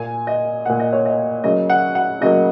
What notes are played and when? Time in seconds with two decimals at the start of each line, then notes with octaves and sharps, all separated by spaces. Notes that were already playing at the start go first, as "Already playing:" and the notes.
Already playing: A#2 A#3 G#5
0.27 D#5
0.66 A#2 A#3 F#5
0.80 D#5
0.93 C#5
1.05 D#5
1.44 C#3 F#3 A#3 D#5
1.70 F#5
1.95 F#5
2.21 C#3 F#3 A#3 D#5